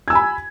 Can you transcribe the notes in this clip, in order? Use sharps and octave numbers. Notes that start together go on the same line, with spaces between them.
G#5 B5 E6 G#6